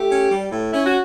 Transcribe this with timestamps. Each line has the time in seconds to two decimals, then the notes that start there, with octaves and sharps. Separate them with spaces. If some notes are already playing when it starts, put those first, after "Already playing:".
Already playing: A3 G4
0.10 C#4
0.30 G3
0.51 A2
0.72 C#4 E4
0.85 F#4